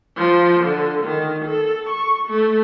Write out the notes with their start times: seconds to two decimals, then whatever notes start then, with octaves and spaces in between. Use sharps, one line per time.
0.17 F3
0.64 D3
1.04 D#3
1.45 A4
1.89 C#6
2.28 A3